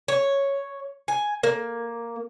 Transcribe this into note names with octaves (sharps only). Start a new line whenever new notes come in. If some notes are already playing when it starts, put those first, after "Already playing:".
C#5
G#5
A#3